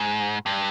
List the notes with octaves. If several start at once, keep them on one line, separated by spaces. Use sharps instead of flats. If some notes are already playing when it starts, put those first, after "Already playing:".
Already playing: G#2
G2